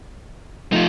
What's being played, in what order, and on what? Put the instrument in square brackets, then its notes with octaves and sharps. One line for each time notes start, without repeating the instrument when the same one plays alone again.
[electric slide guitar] F3 A3 [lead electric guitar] D#4 F4